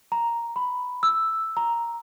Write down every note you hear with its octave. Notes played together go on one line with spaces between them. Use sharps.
A#5
B5
E6
A#5